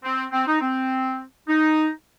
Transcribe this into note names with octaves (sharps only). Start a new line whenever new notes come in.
C4
C4
D#4
C4
D#4